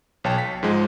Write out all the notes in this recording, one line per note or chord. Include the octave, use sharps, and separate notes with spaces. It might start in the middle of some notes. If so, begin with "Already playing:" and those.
B1 C#5 G5 A5
B6
G#2 F3 G#3